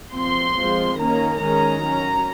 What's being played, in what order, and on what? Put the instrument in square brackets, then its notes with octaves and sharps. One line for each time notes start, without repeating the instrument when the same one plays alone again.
[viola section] F3 C4 C6
F3 G#3 C4
D#3 A#3 C#4 A#5
D#3 G#3 C#4 A#5
F#3 C#4